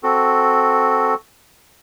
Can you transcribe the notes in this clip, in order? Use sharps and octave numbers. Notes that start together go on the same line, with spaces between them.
C4 F#4 A4